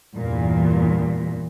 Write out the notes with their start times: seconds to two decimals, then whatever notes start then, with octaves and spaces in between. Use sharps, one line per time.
0.17 E2 G2 A#2 E3